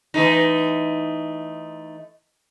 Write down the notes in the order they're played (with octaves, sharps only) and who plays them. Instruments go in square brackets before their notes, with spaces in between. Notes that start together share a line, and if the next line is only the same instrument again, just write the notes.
[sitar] E3 A3 D#4